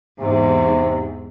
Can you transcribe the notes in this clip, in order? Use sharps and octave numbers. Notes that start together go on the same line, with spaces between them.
E2 G#2 C3